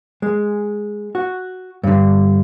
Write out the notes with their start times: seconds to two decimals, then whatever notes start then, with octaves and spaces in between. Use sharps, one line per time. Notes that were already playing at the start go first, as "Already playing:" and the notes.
0.22 G#3
1.15 F#4
1.83 G2 D3